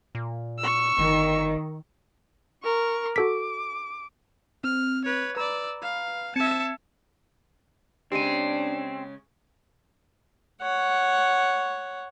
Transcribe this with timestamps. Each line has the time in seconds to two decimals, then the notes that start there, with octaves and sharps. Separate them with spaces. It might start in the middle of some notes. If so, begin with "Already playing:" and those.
0.15 A#2
0.59 C#6 E6
0.98 G1 D#3
2.63 A#4 C#6
3.16 F#4 A4 D6 B6
4.64 C4 F6
5.05 B4 C#5
5.36 B4 D5 A#5 B5 E6
5.82 F5
6.36 C4 E5 A5 G#6 C#7
8.12 C#3 G#3 C4 D4 G4 D#7
10.62 C#5 F#5